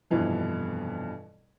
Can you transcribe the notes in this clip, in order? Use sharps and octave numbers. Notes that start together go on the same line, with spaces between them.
F1 G2 B2 E3 F3